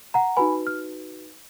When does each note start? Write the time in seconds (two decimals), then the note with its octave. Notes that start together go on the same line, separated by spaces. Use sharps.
0.14 F#5 A#5
0.37 D#4 F#4 B4 G#5 B5
0.67 F6